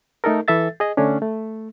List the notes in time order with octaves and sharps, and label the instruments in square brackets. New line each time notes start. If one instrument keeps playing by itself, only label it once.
[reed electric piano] A3 D#4 A4 A#4
E3 A4 E5 A6
G#4 D#5
D3 A3 C#4 D4
A3